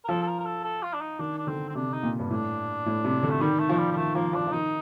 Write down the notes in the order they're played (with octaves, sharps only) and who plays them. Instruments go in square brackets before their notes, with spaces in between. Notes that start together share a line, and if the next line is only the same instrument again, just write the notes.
[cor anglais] A#4
[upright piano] F3 [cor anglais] A4
[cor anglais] A4
A#4
A#4
A4
A4
F4
D4
D#4
[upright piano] D#3 [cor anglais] D4
[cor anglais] D4
[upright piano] D3 [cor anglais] C4
[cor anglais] C4
[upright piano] C3 [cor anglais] D4
[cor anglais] D#4
[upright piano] A#2
G2
[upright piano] A2 [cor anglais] D4
[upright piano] A2
C3
D3
[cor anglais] A3
[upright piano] D#3 [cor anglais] G3
[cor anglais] A3
[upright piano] F3 [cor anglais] A3
[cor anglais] G3
G3
[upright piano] D#3 [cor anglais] A3
[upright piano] F3 [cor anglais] A#3
[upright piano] F3 [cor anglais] D4
[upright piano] F3
[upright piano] D#3 [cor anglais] D#4